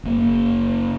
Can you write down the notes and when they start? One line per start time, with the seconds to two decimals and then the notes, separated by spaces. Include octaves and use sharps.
0.04 F#1 A#3